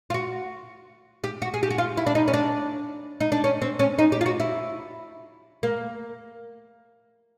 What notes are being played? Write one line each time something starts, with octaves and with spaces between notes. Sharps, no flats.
F4
F#4
G4
F#4
G#4
G4
F#4
F4
E4
D4
D#4
C#4
D4
D#4
D4
C#4
C4
C#4
D#4
G4
F4
F#4
E4
A#3